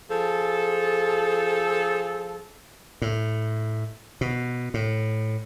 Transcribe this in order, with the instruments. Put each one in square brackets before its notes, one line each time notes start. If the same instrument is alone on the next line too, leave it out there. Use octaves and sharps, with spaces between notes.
[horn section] F3 G#4 A4
[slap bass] A2
B2
A2